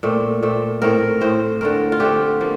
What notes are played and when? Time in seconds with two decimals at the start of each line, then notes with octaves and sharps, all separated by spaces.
0.03 A#2 A3 C4
0.43 A#2 A3 C4
0.82 A2 A3 C4 A#4
1.21 A2 A3 C4 C5
1.61 D3 A3 C4 A#4
1.92 F4
2.00 D3 A3 C4 G4
2.41 F3 A#3